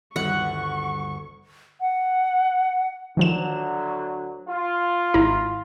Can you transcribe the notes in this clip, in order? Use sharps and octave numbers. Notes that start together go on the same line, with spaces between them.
G1 D2 D#3 G3 F#5 C#6
F#5
D2 D#3 F3 F#3 E7
F4
G#1 E4 A#5